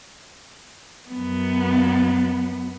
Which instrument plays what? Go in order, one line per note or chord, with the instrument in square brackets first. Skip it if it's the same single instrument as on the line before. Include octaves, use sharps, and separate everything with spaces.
[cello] F#2 B3